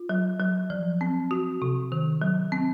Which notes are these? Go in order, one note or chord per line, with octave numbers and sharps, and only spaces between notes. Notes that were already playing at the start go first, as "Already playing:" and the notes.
Already playing: F4
F#3
F#3
F3
C4
F#4
C3
D#3
F#3
C4